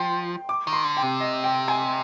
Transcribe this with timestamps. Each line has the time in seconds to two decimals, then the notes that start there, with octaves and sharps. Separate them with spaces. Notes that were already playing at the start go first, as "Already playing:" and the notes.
Already playing: F3 G5 C6
0.49 D6
0.67 D#3
0.73 C6
0.84 D3
0.97 G5
1.03 C3
1.20 D#5
1.44 G5
1.68 G#5